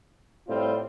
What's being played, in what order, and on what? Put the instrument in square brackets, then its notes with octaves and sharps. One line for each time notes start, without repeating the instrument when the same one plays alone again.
[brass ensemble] A2 G3 C4 F4